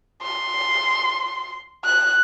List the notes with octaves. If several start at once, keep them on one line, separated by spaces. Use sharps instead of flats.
C6
F#6